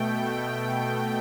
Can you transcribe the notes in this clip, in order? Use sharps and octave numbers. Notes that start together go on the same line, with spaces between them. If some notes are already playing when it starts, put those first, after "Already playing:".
Already playing: B2 A3 G5